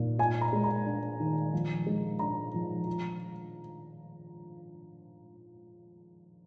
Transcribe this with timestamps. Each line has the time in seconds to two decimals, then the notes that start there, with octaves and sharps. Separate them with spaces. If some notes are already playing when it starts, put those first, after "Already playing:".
Already playing: A#2 D#4
0.18 F4 G#5
0.41 A#5
0.53 G#3
0.64 A#5
0.86 D4
1.20 D#3
1.53 F3
1.87 G#3
2.19 D4 A#5
2.54 F3
2.87 F4